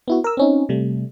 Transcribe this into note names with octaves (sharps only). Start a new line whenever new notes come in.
B3 E4 F#4
A#4 E6
C4 C#4 D#4
C3 G3 A3